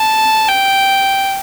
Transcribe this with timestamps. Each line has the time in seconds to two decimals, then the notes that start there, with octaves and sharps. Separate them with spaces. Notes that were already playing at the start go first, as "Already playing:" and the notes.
Already playing: A5
0.48 G5